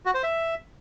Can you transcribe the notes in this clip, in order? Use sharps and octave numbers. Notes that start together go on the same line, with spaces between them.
F#4
C5
E5